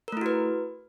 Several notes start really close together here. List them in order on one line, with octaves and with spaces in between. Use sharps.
A#4 A3 E4 F#4 B4